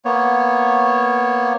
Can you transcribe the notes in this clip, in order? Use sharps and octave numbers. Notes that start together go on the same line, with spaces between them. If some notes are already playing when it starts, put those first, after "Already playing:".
A#3 B3 C#5